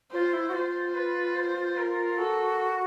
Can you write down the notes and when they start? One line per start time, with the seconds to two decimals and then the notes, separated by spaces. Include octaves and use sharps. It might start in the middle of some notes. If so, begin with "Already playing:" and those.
0.12 F4 C5
0.33 E4
0.49 F#4
0.53 F4 C5
0.95 B4
1.35 C5
1.77 A#4
2.18 F#4 A4